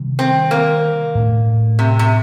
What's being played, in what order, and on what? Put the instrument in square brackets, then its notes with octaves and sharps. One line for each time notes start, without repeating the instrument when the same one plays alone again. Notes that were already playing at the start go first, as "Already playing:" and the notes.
Already playing: [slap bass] C3 D#3 G3 D4
[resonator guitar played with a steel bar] C4
A#3
[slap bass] A2 A3 D4
[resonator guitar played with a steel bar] C3
C3